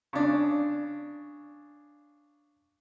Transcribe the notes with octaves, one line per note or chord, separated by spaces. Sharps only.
C#3 D4